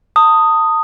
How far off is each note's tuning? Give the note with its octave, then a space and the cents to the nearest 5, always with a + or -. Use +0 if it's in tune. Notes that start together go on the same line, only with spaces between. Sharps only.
A5 +35 D#6 +0